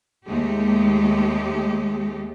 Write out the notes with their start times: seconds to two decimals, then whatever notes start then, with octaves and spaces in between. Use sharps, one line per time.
0.24 D#2 G#3 A3 G4